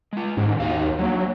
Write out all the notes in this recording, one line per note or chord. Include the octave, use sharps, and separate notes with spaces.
G#3 F4
G#2 D3 D#3 C#4
D#2 D#4 F#4 F5
D3 F#3 A#3